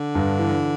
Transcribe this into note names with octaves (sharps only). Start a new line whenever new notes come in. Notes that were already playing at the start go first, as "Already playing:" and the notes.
Already playing: D3
G2
E3